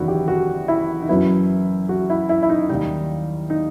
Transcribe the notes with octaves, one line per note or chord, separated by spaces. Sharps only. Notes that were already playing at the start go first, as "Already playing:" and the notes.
Already playing: F#1 E2 D#3 D#4 E4 F#4
G4
F#4
E4
D#4
F#2 F#3 B3 E4
F#4
E4
E4
E4
D#4
D#2 D#3 G3 D#4
D#4